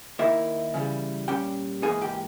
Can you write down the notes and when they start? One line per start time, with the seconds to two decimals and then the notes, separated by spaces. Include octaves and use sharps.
0.19 D#2 D#3 A#3 D#4 E4 E5
0.74 C#3 E3 G3
1.28 A#2 G3 C#4 G4 G5
1.82 G#2 E3 A#3 D#4 G#4 G#5
2.01 G4 G5